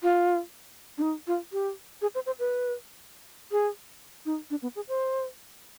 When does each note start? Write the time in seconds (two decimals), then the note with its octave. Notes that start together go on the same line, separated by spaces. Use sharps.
0.03 F4
0.98 D4
1.02 D#4
1.27 F4
1.53 G4
2.02 G#4
2.15 C5
2.26 C5
2.39 B4
3.52 G#4
4.26 D#4
4.50 D4
4.62 B3
4.76 G#4
4.88 C5